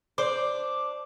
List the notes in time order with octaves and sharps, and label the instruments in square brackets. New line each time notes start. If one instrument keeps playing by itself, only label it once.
[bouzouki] D4 [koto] C5 [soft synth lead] D6